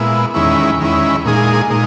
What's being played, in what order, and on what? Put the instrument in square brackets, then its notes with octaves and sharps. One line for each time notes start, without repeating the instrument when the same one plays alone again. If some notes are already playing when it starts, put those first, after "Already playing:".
Already playing: [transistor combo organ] A#2 G#3 B3 E4
E2 D#3 G#3 C#4 E4
E2 D#3 G#3 C#4 E4
A#2 G#3 D#4 G#4
A#2 G#3 D#4